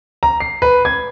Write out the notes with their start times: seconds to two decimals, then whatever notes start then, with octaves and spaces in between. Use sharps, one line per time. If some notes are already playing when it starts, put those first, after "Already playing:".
0.23 A#5
0.40 C7
0.62 B4
0.85 G#6